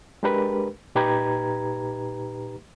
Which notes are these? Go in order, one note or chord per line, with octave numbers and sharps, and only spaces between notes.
G#3 D4 G4 A#4 B4
A#2 D#4 G4 B4 A#5 G#6